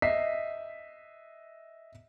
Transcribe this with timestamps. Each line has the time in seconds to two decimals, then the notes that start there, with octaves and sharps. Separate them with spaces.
0.02 D#5 E5 B6 C7